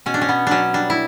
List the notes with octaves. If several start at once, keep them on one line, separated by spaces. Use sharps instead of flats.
B2 C#4
D4
C#4
B2 B3
F#3 C#4 D4
G3 D4
E4